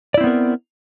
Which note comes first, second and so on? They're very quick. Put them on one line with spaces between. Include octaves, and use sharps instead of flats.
D5 E4 C4 B3 A#4